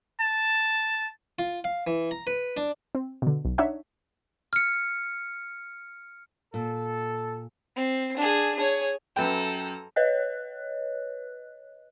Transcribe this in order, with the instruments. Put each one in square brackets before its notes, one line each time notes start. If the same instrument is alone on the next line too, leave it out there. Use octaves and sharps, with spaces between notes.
[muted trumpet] A5
[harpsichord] F4
F5
E3
A#5
B4
D4
[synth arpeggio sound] C4
B2 D3
B1
D4 D#4 C#5 E5 F#5
[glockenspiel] F6 C#7
[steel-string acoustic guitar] A#2 [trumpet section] A4
[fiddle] C4
D4 G#4
G#4 C#5
[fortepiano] F#2 B4 G5 [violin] A4 A#5
[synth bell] B4 C#5 D#5 F#6